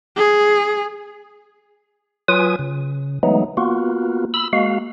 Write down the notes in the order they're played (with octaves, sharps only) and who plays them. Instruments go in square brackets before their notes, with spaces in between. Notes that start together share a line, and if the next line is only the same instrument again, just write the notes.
[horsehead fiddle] G#4
[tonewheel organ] F#3 F4 B4 G#5 D#6
C#3
E3 F#3 G#3 A3 B3 D#4
A#3 B3 F4 F#4
B5 E6
G#3 A#3 F#4 F5